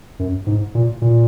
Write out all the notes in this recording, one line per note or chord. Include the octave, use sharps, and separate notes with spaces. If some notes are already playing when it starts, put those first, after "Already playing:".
F#2
G#2
A#2
A#2